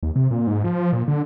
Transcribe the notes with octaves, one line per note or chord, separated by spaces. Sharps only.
D#2
C3
A#2
G#2
F3
A#2
D3